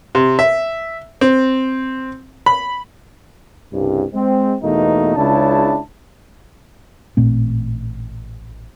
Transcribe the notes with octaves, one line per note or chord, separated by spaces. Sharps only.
C3
E5
C4
B5
C2 G2 C#3
G#3 C4
E2 B2 A3 A#3 D#4
C#2 C#3 D4 E4 A5
A1 A#2 A3 C4